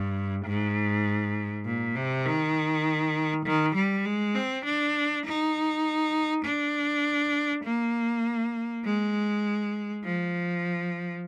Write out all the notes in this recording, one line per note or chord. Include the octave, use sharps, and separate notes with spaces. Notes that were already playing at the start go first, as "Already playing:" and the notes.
Already playing: G2
G#2
A#2
C3
D#3
D#3
G3
G#3
C4
D4
D#4
D4
A#3
G#3
F3